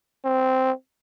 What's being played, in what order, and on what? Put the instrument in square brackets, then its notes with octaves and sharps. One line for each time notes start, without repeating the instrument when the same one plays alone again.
[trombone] C4